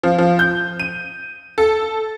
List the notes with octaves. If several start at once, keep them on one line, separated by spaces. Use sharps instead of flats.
F3
F3
G6
D#7
A4